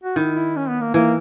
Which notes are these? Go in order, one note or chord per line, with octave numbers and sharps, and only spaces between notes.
F#4
D#3 E4
E4
C#4
B3
A#3
E3 A#3